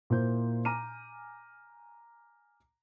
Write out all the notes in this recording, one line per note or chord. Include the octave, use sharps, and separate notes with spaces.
A#2 A#3 E4 A#4 C5 G6
G#5 A#5 D6 F6 D#7